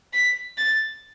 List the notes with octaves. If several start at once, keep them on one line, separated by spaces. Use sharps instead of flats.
B6
A6